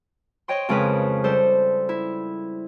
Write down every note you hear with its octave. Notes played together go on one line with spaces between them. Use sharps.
C#5 D#5 G5 C6
F2 C#3 G#3 A#4 B4
G3 A4 C5
E4